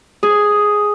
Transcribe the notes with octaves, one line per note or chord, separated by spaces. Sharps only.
G#4